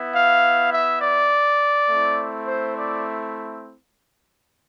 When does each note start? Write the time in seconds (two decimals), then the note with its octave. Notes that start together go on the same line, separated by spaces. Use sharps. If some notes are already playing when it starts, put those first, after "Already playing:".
Already playing: B3 E4
0.14 F5
0.72 E5
1.01 D5
1.89 A3 C4 E4
2.47 C5
2.77 D5